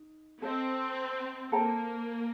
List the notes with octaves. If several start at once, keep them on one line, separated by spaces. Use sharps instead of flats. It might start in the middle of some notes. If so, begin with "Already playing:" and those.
Already playing: D#4
C4 A4 C5 D#5
A#3 A4 C5 G5 A#5